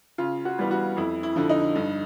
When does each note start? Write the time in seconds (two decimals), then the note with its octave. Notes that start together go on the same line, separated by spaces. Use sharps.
0.18 C#3 F4
0.45 F#4
0.58 E3 G3 B3
0.71 F#4
0.97 F2 E4
1.23 E4
1.36 D3 F3
1.50 D#4
1.76 G2